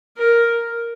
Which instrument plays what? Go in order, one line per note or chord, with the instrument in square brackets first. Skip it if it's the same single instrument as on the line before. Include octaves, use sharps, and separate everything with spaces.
[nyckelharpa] A#4